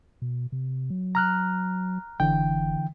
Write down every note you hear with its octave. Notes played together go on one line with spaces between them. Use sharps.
B2
C3
F#3
A#5 F6 F#6
F#1 D3 E3 G5